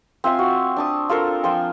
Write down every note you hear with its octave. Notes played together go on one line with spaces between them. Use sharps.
C4 F4 E5 G#5
F#4
D4 A5 D#6
F4 A4 A#4 C5
F3 C5 G5 G#5